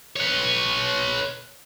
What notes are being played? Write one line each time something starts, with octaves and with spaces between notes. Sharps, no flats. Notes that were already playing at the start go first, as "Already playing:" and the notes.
B4 C#5